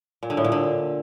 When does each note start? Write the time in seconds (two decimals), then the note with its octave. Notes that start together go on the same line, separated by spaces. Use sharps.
0.23 A#2
0.30 D3
0.37 A2
0.44 A#2
0.52 D3